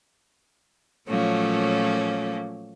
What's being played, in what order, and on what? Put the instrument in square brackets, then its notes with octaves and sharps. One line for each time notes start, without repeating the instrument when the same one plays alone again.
[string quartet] A#2 F3 F#3 A3 A#3 C#4